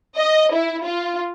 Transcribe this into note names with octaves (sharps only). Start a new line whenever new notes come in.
D#5
E4
F4